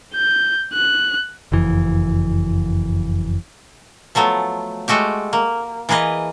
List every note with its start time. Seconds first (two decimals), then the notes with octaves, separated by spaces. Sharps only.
0.14 G6
0.74 F#6
1.52 F#1 F2 E3
4.15 F3 F#3 A3 B3
4.88 G#3 A3 F#4 G4
5.33 A#3
5.89 E3 A#3 G#4 B4 D#5